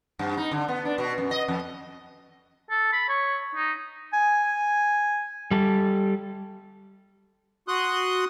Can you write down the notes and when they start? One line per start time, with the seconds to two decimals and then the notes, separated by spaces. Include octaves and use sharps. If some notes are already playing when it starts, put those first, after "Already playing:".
0.19 G2
0.37 D#4
0.51 D3
0.68 B3
0.85 D4
0.98 B2
1.18 F#2
1.31 D#5
1.48 F2
2.70 A4
2.92 B5
3.09 C#5
3.55 D#4
4.13 G#5
5.51 G3 A4
7.68 F#4 C6 D#6 F#6